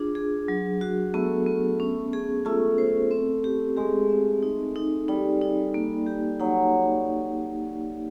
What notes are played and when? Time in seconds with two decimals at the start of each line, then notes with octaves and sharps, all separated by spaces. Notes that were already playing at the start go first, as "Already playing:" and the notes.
Already playing: D4 F4 G#4
0.15 G#4
0.48 F#3
0.81 F#4
1.14 A3 B3
1.47 B3
1.80 C#4
2.13 G#4
2.45 A3 F4
2.78 C5
3.11 C4
3.44 G4
3.77 G#3 G4
4.09 C4
4.43 D#4
4.76 D#4
5.08 G3 D#4
5.41 D#4
5.74 A#3
6.06 G4
6.40 F#3 D#4